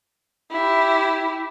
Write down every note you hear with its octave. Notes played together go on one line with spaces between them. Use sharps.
E4 G4